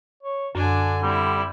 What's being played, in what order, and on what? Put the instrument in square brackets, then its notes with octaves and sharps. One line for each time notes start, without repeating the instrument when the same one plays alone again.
[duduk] C#5
[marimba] F#2 [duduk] D3 [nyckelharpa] D4 G#5
[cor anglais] G3 [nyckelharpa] C4 E4